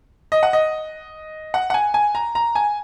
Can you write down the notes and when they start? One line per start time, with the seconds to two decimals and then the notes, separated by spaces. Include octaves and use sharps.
0.32 D#5
0.43 F#5
0.53 D#5
1.54 F#5
1.70 F#5
1.74 G#5
1.94 G#5
2.15 A#5
2.35 A#5
2.55 G#5